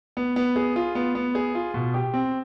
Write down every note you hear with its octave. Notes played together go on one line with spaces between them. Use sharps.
B3
B3
G#4
F4
B3
B3
G#4
F4
B2
G4
C4